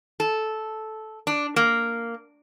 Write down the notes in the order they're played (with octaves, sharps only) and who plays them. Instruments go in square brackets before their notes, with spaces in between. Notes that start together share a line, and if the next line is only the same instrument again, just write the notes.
[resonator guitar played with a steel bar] A4
D4
A#3